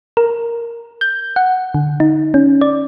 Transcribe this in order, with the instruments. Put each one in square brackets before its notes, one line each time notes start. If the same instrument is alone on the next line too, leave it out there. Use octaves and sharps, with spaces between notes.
[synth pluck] A#4
G6
F#5
D3
D#4
C#4
D5